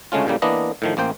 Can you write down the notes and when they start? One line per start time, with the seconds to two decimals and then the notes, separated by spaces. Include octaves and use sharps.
0.12 D2 C#3 G#3 A3 C#4 F4
0.27 A2 C#3 G3 A#3
0.42 E3 A#3 B3 D4 D#5
0.82 A2 D#3 F3
0.97 A1 A#3 C5 G5